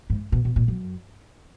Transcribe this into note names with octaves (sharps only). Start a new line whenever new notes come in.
G#2
B2
B2
A#2
F#2